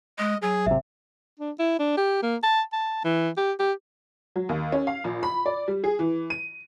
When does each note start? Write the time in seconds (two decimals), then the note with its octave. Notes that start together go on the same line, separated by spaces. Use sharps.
0.19 G#3 D#5
0.42 F#3 G#4
0.66 G#1 C3 E5
1.39 D4
1.59 E4
1.79 D4
1.97 G4
2.23 A#3
2.43 A5
2.72 A5
3.04 E3
3.37 G4
3.59 G4
4.36 F#3
4.49 D#2
4.72 C#4
4.87 F5
5.04 A#1
5.23 B5
5.46 D5
5.68 G3
5.84 G#4
5.99 E3
6.30 D#7